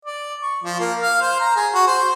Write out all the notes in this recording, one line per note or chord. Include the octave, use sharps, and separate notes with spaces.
D5
C#6
F3
A#3
F5
C5
A#5
G#4
F#4
C5